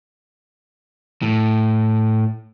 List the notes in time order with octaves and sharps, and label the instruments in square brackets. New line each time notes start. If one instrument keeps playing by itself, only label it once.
[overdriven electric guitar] A2